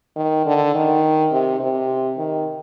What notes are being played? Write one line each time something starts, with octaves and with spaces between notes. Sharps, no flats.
D#3
D3
D#3
C3
C3
D#3